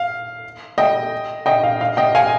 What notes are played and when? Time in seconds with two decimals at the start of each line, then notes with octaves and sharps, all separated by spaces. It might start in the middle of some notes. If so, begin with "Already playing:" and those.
Already playing: F5
0.78 D#5 G5
1.46 D#5 G5
1.64 F5
1.81 F5
1.97 D#5 G5
2.15 F5 G#5